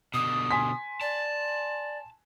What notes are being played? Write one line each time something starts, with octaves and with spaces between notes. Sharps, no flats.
B2 D3 D#6
G#5 C6 B6
D5 A5